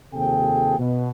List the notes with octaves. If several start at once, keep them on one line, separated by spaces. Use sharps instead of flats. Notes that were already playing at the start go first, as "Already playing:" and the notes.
D#2 C3 F3 G#4 A4 G5
B2